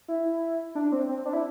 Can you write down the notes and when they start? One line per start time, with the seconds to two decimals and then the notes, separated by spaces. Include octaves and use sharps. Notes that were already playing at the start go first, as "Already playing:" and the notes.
0.08 E4
0.75 D4
0.92 C4
1.09 C4
1.25 D4
1.33 E4